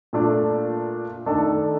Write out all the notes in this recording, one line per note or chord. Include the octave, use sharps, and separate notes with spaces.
A#2 A3 D4
D#3 A3 D4 A4